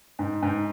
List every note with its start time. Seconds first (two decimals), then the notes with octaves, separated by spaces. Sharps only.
0.19 G#2
0.43 G#2